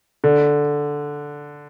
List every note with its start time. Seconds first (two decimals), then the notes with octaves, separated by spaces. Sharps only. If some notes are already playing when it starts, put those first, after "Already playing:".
0.24 D3